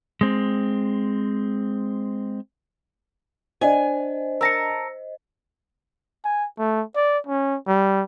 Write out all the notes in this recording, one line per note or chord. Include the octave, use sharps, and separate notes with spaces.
G#3 C4
D4 C5 D#5 G#5
A#4 A5 E6 A#6 C#7
G#5
A3
D5
C#4
G3